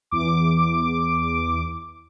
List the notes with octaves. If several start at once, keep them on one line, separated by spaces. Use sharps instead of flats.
E2 D6